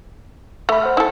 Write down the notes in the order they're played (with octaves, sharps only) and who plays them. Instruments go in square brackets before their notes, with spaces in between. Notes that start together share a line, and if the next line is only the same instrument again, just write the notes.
[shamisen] A3 [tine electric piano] E5 B5
[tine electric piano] C5 F#5 F6
[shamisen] E4 A4